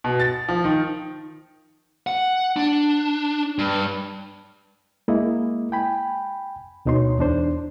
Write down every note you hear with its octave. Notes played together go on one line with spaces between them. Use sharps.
B2
A6
F3
D#3
F#5
D4
G2
G#3 A#3 E4 D#5
G5 G#5 B5
D2 B2 D#4 C#5 C6
E2 D4 C5